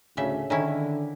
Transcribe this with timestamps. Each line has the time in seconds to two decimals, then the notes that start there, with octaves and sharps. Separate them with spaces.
0.17 D2 A2 C#3 E5
0.50 D3 D#3 C#4 E4